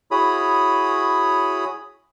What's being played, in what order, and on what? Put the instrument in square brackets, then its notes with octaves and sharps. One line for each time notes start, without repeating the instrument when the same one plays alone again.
[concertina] E4 F#4 G#4 C#5 B5 D#6